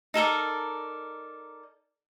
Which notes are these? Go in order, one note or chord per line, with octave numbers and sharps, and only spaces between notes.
D#4 A4 A#4 D5